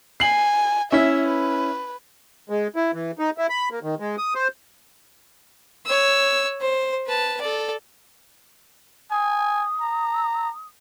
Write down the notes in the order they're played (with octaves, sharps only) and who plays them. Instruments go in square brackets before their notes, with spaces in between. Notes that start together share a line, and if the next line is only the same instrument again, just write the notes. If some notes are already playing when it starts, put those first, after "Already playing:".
[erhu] G#5 [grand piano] C7 F#7
[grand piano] C#4 E4 B6 [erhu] E5
[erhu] B4
[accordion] G#3
E4
E3
D#4
E4
B5
A#3
D#3
G#3
D#6
C5
[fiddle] C#5 E6
C5
B4 A5
A4 D5
[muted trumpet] G#5 [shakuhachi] D#6
[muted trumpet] A#5